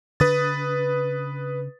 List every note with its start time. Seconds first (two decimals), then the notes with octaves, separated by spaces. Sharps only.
0.20 C#3 D4 B4 D#6 A6